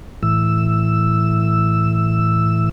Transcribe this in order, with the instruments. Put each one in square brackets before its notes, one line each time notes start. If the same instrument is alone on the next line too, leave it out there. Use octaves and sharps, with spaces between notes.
[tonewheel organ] A2 E3 E6